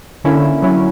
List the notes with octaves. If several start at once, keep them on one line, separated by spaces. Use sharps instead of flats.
D3 A#3 C#4 E4
F#3 C#4 E4